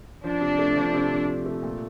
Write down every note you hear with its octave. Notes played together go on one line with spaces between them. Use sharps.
F3 D4
C3
A3
F3
C3
F3
C3
A3
A#2